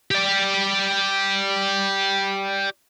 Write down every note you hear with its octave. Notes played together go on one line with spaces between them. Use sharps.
G4 D5